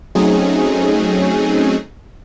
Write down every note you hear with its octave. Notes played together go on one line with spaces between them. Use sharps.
F#3 A3 C4 C#4 D#4 G#4